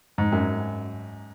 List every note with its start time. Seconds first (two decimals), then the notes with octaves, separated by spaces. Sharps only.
0.18 G#2
0.32 F#2